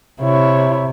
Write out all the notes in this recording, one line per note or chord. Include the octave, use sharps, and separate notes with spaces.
C3 E4 C#5